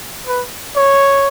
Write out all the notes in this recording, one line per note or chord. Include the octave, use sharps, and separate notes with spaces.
B4
C#5